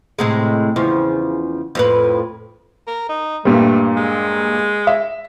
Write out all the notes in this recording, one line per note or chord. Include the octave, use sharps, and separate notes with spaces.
A2 C3 G#3
E2 C#3 F3
F2 A2 B4
A#4
D#4
G2 A#2 G3 A3
G#3
E5